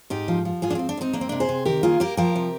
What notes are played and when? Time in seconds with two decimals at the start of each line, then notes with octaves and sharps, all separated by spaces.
0.10 G#2 D#4 G4
0.28 F3
0.45 F3
0.62 G#2 F4 G#4
0.70 D4
0.75 G#2 C4
0.89 D4
0.97 G#2 C4 D#4
1.13 A#3 D4
1.21 C4
1.29 C3 D4
1.40 G#4 C5
1.49 C3
1.65 D#3 G4 A#4
1.83 A#3 F4 G#4
2.00 A#3 G4 A#4
2.17 F3 G4 A#4
2.36 C3